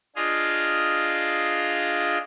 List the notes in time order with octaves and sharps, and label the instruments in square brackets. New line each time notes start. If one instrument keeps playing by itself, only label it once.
[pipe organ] D4 F4 G#4 D#5 F5